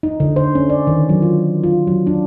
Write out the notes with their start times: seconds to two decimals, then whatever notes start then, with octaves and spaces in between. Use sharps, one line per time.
0.03 D#4
0.20 D3
0.36 C5
0.55 C#4
0.70 D5
0.87 D#3
1.09 F#3
1.22 F4
1.63 F4
1.87 F#3
2.07 D4